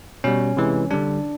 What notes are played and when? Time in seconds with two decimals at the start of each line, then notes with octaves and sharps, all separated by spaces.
0.24 B2 G3 C#4
0.57 C3 E3 G#3
0.91 D3 G3 D4